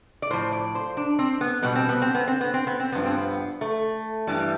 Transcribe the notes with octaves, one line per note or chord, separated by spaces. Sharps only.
D5
A2 F3 C5
D5
C5
D4
C4
B3
B2 G3 B3
C4
B3
C4
B3
C4
B3
C4
B3
C4
G2 F3 B3
C4
B3
A3
G2 E3 G3